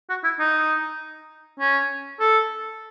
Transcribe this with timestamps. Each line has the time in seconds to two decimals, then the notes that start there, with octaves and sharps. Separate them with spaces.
0.09 F#4
0.24 E4
0.39 D#4
1.60 C#4
2.20 A4